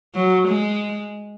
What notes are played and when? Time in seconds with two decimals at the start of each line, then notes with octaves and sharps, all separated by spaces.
0.15 F#3
0.48 G#3